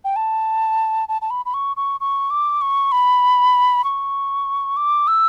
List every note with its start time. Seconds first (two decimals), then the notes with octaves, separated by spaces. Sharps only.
0.05 G5
0.16 A5
1.09 A5
1.22 A5
1.30 B5
1.46 B5
1.54 C#6
1.77 C#6
2.00 C#6
2.30 D6
2.61 C#6
2.92 B5
3.84 C#6
4.77 D6
5.08 E6